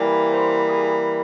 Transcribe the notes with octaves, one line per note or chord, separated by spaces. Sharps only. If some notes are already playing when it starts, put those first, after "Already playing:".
Already playing: E3 G3 A#3
C5
G#4